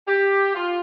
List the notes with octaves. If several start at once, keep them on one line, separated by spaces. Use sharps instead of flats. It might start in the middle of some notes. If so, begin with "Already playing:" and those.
G4
F4